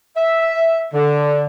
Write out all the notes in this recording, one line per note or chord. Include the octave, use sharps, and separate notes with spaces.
E5
D3